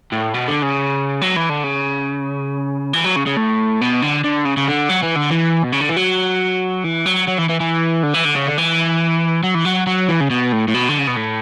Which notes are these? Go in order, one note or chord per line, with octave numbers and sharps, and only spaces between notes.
A2
B2
D3
C#3
F#3
E3
D3
C#3
E3
F#3
C#3
C#3
A2
B2
D3
D3
C#3
C#3
D3
F#3
E3
D3
E3
B2
C#3
D3
E3
F#3
E3
F#3
F#3
E3
E3
E3
D3
E3
D3
C#3
D3
E3
F#3
E3
F#3
F#3
E3
C#3
B2
A2
A2
B2
D3
C#3
B2
A2